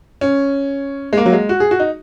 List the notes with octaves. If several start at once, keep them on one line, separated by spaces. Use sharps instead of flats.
C#4
G#3
A#3
F#3
G#3
F#4
G#4
F#4
D#4